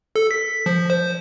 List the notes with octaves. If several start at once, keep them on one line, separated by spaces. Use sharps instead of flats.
A4
B6
F3
C5